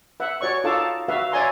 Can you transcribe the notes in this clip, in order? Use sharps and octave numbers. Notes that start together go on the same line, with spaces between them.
B4 E5 F#5
F#4 C#5 D5 C#6
D#4 F4 A4 F5 A5 D6
F#4 B4 E5 F5
C#5 D5 E5 G#5 A#5 C6